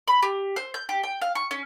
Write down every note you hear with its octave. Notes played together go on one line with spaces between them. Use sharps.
B5
G4
C5
G6
G4
G5
F5
C#6
C#4